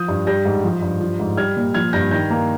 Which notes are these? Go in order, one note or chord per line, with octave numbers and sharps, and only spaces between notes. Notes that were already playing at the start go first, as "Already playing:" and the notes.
Already playing: F3 D#6 G6
G2
G3 G6 A#6
G#2
F3
G2
F3
G#2
G3 F6 G#6
A#2
F3 F6 G#6
G2 G6 A#6
D#3 G6 A#6
A#3